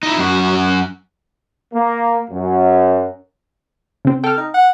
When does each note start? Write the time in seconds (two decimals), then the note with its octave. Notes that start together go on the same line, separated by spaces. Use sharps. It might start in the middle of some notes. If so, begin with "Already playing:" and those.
0.03 D#4 E4
0.17 F#2 F#4
1.72 A#3
2.30 F#2
4.05 C#3 C4
4.24 A4 G5 F6
4.37 D#4
4.54 F#5